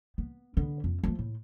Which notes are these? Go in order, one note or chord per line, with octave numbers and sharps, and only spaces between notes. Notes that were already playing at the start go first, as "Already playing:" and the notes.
B3
D3 B3
F2
F3 A3
A2